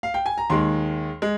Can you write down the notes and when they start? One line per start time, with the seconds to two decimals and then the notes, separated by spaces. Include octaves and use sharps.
0.03 F5
0.14 G5
0.26 G#5
0.38 A#5
0.50 D#2 D#3 G#3 C6
1.22 G#3